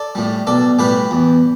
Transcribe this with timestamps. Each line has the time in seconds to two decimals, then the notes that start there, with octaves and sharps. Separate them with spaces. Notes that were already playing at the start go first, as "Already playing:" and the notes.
Already playing: A4 D5
0.15 A2 G3
0.47 B1 A4 D5
0.79 A2 G3 G4 B4
1.11 E2